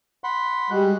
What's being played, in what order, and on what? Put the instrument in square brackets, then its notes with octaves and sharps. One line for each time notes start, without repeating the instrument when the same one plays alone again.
[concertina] F#5 B5 C6
[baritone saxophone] G3 [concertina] G#3 F#4 F#6